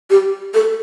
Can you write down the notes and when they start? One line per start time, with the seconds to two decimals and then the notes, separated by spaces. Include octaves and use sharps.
0.10 G4
0.54 A4